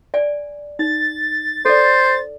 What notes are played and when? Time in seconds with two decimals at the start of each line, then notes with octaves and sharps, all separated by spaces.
0.14 D5 G#5
0.79 D#4 A6
1.65 A4 C5 D5